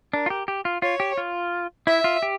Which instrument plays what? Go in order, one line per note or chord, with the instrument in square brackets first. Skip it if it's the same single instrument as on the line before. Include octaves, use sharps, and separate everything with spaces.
[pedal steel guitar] D4 [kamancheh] A#4
[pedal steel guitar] F4
G4
G4
F4
[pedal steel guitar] F4 [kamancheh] C#5
[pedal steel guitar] G4
F4
[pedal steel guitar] E4 [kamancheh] E5
[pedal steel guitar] F4
G4